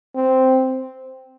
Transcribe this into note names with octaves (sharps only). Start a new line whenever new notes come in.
C4